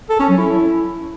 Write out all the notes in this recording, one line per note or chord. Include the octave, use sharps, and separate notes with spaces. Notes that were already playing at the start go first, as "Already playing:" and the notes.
A4
C#4
F#3
E4